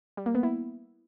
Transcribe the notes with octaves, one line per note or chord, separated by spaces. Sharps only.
G3
A#3
B3
E4